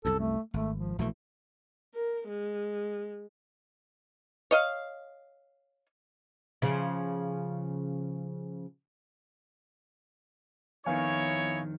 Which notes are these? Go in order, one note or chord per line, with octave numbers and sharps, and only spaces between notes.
C2 F#2 A4
A3
G#1 A3
F3
A#1 B2 E3 A3
A#4
G#3
C#5 D#5 F5
C#3 F3
F2 D#3 B3 D#4 E4 C#5 F5 G#5